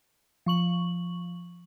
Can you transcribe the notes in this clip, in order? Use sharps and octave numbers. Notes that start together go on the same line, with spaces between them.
F3 C#6 F#7